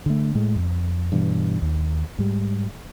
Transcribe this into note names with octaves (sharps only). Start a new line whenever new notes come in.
D3 A3
A2 G#3
F2
G2 B2 E3
D#2
G#2 G3